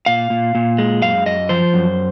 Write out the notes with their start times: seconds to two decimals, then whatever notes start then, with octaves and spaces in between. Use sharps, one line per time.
0.06 A#2 F5
0.30 A#2
0.55 A#2
0.78 G#3
1.02 F#2 F5
1.26 F#2 D#5
1.49 F3 C5
1.74 F#2